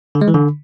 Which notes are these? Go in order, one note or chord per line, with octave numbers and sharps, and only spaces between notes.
D3
G#3
E3
D3